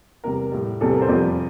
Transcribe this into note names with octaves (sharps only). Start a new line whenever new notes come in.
E2 C3 G3 A#4
A2 G3
E2 C3 G3 A4
A#4
C5
F2 C3 G3 D5